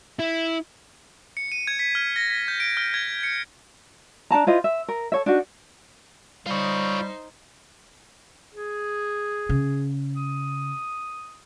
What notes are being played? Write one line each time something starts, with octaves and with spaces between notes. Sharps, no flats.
E4
C#7
D#7
G#6
B6
F6
A#6
B6
G6
D7
F6
G#6
C#7
D4 D#4 A5 A#5
E4 F4 C5 D#5
E5
A#4
A4 C#5 E5
D4 D#4 F#4
G3 D#4 F4 C5 C#5
G#4
C#3
D#6